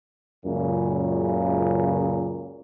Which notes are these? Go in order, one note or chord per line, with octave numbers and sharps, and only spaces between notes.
C#2 F#2 A#2 C#3